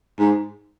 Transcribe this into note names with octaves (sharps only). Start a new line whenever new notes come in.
G#2